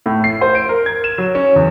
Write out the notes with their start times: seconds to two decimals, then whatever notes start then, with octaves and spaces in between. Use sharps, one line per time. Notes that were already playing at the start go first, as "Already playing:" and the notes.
0.06 A2
0.24 C7
0.41 C5
0.55 D7
0.69 A#4
0.86 G#6
1.04 E7
1.18 F#3
1.35 C#4
1.56 E2